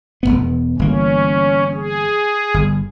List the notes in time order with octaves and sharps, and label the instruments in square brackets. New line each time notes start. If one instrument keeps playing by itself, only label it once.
[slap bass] E1 E2 B3
[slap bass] G1 E3 A#3 [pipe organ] C#4
[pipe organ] G#4
[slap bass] G1